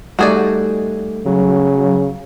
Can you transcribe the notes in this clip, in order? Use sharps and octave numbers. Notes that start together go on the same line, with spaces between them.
G3 A3 D#4 F#4 G#4 D5
C#3 F#3